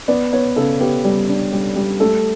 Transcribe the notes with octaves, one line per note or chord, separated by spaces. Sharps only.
B3 D5
B3 C#5
C#3 A4
B3 G4
G3
D4
G3
G3
A3 A4